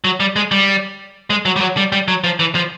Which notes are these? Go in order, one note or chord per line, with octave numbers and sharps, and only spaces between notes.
F#3
G3
G#3
G3
G#3
F#3
G3
F#3
G3
G3
F#3
F3
E3
F3